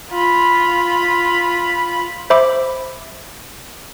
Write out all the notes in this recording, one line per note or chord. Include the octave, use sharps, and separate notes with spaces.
F4 B5
C5 E5 B5 D6